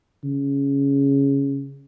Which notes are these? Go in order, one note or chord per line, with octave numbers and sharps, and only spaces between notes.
C#3